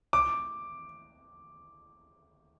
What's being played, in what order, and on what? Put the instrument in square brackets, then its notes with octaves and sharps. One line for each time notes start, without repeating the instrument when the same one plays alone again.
[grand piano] D6